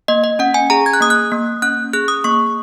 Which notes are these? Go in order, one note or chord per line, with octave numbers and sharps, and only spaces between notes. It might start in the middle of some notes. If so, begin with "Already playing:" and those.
A#3 D#5
D#5
C#4 F#5
G#5
G#4 A#5
G#6
F#6
A#3 D#6
F#6
A#3
C#4 F#6
G#4 F#6
D#6
A#3 C#6